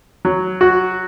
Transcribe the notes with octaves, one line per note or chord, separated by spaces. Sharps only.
F#3
F#4